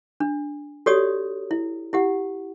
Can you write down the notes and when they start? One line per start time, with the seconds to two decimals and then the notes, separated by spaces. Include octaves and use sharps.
0.20 D4
0.86 F#4 G4 A4 C#5 D5 D#6
1.51 E4
1.93 E4 G4 F#5